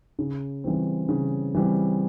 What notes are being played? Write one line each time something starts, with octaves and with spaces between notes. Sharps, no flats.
C#3
E3 G3 C4
C#3
E3 G3 C4